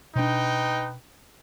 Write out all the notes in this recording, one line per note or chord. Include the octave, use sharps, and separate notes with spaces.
B2 D4 D#4 B4 G5